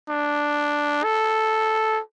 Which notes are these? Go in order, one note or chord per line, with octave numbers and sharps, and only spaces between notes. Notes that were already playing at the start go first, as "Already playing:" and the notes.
D4
A4